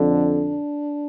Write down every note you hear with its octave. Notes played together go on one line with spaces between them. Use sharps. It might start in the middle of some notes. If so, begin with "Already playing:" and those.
Already playing: F2 D3 D4